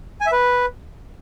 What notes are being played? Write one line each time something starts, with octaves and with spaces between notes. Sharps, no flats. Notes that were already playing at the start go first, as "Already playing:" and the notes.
G#5
E5
B4